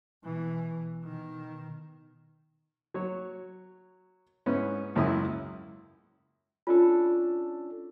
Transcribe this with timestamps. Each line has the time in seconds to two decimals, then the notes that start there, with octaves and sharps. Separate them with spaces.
0.24 B2 E3
1.03 B2 D#3
2.94 F#3 C#5
4.46 G#2 B3 C#4 E4
4.95 C#2 F#2 E4 D#6
6.67 C#4 D4 F4 A4